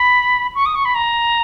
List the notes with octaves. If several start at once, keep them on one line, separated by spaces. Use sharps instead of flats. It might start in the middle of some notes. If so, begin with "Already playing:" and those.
Already playing: B5
C#6
D#6
C#6
B5
A#5